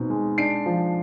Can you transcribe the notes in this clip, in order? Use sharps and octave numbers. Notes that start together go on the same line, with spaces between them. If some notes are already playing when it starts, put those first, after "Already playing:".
Already playing: B2 C4 D#4
G#3
D4 C7 D7
F3